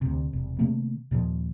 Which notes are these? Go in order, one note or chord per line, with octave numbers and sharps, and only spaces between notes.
D2 C3
E1 C2
C3 D#3 A3 A#3
D#2 A#2 D#3 F3